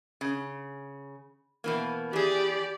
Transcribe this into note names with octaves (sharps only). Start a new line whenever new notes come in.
C#3
B2 E3 A#3
E3 G4 G#4 D5